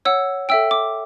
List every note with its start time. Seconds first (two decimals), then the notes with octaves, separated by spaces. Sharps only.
0.05 C#5 F#5 E6
0.49 A4 E5 G5 E6
0.71 D6